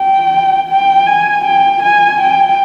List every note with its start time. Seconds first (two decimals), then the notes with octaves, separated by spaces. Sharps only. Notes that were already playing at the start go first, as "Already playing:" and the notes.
Already playing: G5
0.69 G5
1.07 G#5
1.45 G5
1.83 G#5
2.21 G5